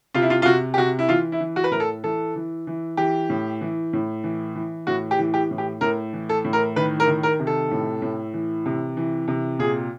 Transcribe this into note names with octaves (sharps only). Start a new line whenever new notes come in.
C3 F4
E4
F4
F4
C3 F#4
G4
C3 F#4
E4
E3 F4
E4
E3
F#4
B4
A2 A#4
A4
E3 A4
E3
E3
E3 G4
A2
E3
A2
E3
E3
A2 F#4
G4
E3
G4
A2
G4
A2 A#4
E3
A4
A2
A#4
D#3 B4
A#4
D#3
A#4
C3
A4
A2
A2
E3
C3
E3
C3
A#2 G#4